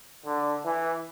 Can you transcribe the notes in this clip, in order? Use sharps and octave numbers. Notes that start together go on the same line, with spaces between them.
D3
E3